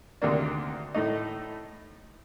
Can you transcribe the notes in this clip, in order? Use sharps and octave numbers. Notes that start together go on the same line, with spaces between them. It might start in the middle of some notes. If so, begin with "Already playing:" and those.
D2 C3 D#3 A#3 D4
A2 A3 D#4